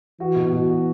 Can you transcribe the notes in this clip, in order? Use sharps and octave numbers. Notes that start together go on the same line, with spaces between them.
E3 F#4
B2
B2
F#4